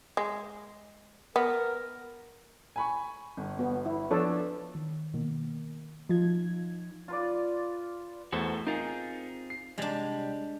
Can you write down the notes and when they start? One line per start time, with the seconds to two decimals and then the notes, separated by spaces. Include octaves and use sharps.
0.17 G#3
1.36 B3 A#4
2.76 G#5 B5 C#6
3.37 G1
3.59 B3 F#4
3.85 E4
4.11 F3 B3 D4 A4 C#5
4.75 D#3
5.14 B2 D#3 A#3
6.09 F3 D#4 F4 G#6
7.08 F4 B4 D5
8.32 E2 A3 F#4 A4 C5
8.67 C4 D#4 F4 G#4 A#4
9.50 C7
9.78 C2 G3 G#3 D4